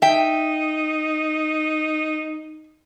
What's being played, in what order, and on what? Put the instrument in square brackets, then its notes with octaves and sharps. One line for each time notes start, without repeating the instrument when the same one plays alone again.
[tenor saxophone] D#4 [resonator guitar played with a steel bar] E5 G5